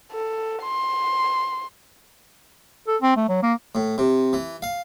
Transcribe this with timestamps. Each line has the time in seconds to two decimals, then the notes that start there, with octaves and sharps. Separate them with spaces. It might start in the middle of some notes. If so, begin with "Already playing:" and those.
0.11 A4
0.63 C6
2.88 A4
3.02 C4
3.16 A3
3.29 F#3
3.43 A#3
3.75 A2
3.98 C3
4.33 E3
4.62 F5